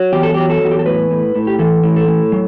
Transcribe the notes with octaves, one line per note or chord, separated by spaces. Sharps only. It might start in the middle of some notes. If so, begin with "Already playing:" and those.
Already playing: F#3
E2 G4
A4
F#3 G4
A4
E2 F#4
G4
A4
A2 B4
A2
A2
G4
E3 A4
A2
A4
A2
F#3